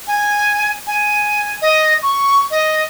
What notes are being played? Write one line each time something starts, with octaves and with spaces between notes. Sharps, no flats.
G#5
G#5
D#5
C#6
D#5